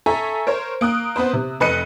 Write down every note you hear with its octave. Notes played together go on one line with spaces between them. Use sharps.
A4 E5 G#5 A#5 C#6
A#4 C5 C#5
A#3 D#6 F#6
B3 C4 B4 C5
C3
F1 B4 D#5 F#6 C#7 D#7